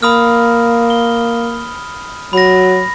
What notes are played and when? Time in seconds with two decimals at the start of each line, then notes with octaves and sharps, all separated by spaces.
0.03 A#3 B5 D#6 F6
0.90 G7
2.33 F#3 B5 A#6